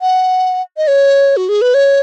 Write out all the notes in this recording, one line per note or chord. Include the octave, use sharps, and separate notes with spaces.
F#5
D#5
C#5
F#4
G#4
B4
C#5